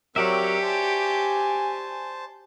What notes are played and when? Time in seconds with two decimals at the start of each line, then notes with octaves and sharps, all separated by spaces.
0.16 F#3 C4 G4 A#4 C#5 D5 E5
0.63 C5 G#5 A5